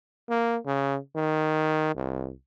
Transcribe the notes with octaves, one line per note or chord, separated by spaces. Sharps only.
A#3
C#3
D#3
C2